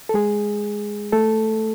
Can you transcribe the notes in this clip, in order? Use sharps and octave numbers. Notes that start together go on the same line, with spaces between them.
A4
G#3 G#4
A3 A4